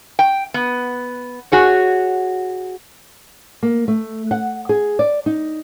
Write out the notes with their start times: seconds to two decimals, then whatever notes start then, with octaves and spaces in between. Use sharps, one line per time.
0.19 G5
0.54 B3
1.52 F#4 G#4 C#5
3.63 A#3
3.88 A3
4.31 F#5
4.69 G#4
4.99 D5
5.26 D#4